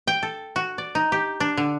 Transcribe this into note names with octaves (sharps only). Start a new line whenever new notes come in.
G5
A4
F#4
D5
D#4
G4
D4
D3